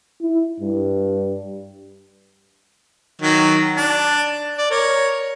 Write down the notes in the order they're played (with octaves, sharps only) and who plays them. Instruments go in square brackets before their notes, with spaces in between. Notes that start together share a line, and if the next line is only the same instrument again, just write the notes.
[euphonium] E4
G2
[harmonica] D#3 F#3
D4
D5
A#4 C#5